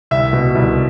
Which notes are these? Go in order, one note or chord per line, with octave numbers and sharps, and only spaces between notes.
C2 E5
B2
C2